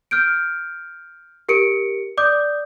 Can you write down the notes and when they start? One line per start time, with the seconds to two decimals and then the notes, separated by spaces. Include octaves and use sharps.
0.11 F6 G6 D7
1.49 G4 A#4 C#7 D7
2.17 D5 D6 D#6 G6